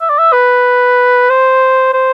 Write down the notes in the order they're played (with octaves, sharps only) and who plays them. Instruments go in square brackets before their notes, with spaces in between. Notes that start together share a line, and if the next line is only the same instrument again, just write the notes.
[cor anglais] E5
D5
E5
B4
C5
C5